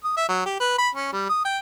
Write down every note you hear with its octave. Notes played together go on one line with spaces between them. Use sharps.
D#6
E5
F#3
G4
B4
B5
C#4
G3
D#6
G5